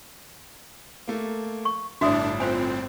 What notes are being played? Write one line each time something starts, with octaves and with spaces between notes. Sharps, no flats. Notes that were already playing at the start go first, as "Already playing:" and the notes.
A3 A#3
C#6
G1 A2 D4 F#4 E5 D#6
C4 F4 C5 G#5